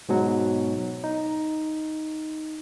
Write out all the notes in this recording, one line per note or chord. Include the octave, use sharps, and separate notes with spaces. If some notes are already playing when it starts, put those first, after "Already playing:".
G#2 B2 F#3
D#4